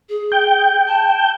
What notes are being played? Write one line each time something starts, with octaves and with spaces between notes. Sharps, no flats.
G#4
G5
A5